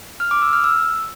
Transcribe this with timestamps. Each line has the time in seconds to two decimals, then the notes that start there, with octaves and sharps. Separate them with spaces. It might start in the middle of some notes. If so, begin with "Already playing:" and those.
0.20 F6
0.31 D6
0.42 E6
0.53 F6
0.64 E6